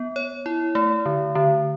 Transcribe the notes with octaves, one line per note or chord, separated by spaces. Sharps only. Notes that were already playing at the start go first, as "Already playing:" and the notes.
Already playing: B3
C#5
E4
A3
D3
D3